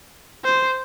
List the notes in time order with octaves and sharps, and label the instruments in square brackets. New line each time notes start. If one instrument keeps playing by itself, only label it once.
[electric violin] C5